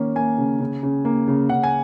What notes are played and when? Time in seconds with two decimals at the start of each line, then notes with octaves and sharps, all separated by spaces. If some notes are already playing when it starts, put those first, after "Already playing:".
Already playing: D#3 A#3 C#4
0.15 A#3 G#5
0.38 C#3
0.60 C#3
0.83 C#3
1.05 A#3
1.28 C#3
1.49 C#3 F#5
1.63 G#5